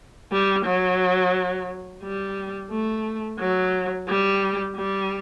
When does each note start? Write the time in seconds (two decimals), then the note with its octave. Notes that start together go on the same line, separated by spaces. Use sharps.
0.32 G3
0.65 F#3
2.03 G3
2.71 A3
3.39 F#3
4.08 G3
4.76 G3